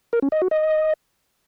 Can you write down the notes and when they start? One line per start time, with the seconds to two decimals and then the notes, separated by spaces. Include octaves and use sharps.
0.13 A#4
0.22 C#4
0.32 D#5
0.42 F#4
0.51 D#5